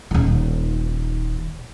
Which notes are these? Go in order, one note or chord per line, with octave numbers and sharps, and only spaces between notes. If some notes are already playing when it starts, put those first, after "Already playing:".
D#1 D#3